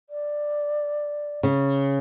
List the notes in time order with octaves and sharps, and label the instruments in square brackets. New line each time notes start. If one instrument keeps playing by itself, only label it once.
[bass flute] D5
[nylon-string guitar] C#3